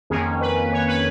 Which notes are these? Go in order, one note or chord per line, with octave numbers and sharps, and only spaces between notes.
F2 D#3 A#3 C#4 G#4
B4
C#5
B4